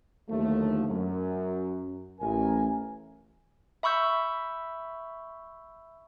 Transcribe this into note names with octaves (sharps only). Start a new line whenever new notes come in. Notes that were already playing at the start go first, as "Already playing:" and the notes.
D#2 D3 F3 F#3 A3
F#2 F#3
A1 A#4 G#5
E5 B5 C#6 E6 G6